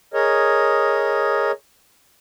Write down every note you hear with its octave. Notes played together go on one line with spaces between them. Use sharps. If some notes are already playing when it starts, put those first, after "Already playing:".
G#4 A#4 C#5 D#5